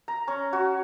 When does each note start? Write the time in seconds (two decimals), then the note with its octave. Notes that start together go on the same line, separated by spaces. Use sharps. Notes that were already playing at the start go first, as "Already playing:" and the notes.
0.08 A#5
0.28 C#4
0.53 F#4